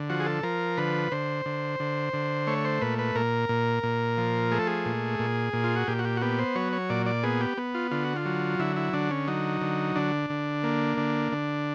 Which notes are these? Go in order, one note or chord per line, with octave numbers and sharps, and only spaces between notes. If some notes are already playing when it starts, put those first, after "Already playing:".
Already playing: D3
F3 F#4
G#4
A4
F3 A#4
D3 B4
D3 C5
D3
D3
D3
A3 C#5
C5
A#2 B4
B4
A#2 A#4
A#2
A#2
F3
A3 G#4
A4
G#4
A#2
A#2
A#2
F4
F#4
A#2 G4
F#4
G4
F#4
B3 G4
C5
F#3 C#5
C#5
A#2 D5
D5
B3 G#4
G4
B3
F4
D3 F4
F#4
F4
F#3
D3 E4
E4
D3 D4
C#4
F#3 D#4
D3
D3 D4
D3
A#3
D3
D3